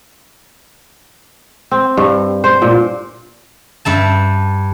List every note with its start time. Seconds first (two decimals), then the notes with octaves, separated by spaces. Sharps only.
1.72 C4
1.97 G2
2.44 C5
2.62 A#2
3.85 G2 E5 A5